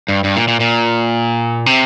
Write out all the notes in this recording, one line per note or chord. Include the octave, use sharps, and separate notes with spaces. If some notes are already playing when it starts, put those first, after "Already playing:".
G2
G2
A#2
A#2
A#2
C3